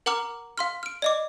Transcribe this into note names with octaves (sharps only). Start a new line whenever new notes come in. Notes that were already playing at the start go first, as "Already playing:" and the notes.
A#4 F#5 A#5 D6 F6 F#7
F5 C6 F6
F6 D7
D5 D#5 D6